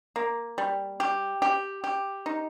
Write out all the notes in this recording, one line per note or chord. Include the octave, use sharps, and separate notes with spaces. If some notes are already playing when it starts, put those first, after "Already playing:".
A#3
G3
G4
G4
G4
D#4